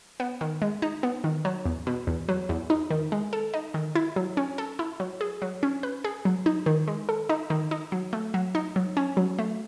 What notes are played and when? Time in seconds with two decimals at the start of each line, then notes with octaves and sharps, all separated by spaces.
0.20 B3
0.41 D#3
0.62 G#3
0.82 D#4
1.03 B3
1.24 D#3
1.45 F#3
1.66 E2
1.87 B2
2.07 E2
2.29 F#3
2.49 E2
2.70 D#4
2.90 D#3
3.12 G#3
3.33 A4
3.54 D#4
3.74 D#3
3.95 E4
4.16 F#3
4.37 C#4
4.58 A4
4.79 E4
5.00 F#3
5.21 G#4
5.42 F#3
5.63 C#4
5.83 B4
6.04 G#4
6.25 F#3
6.46 D#4
6.66 D#3
6.88 G#3
7.09 A4
7.29 D#4
7.50 D#3
7.71 D#4
7.92 F#3
8.13 A3
8.34 F#3
8.55 D#4
8.76 F#3
8.97 C#4
9.17 F#3
9.39 A3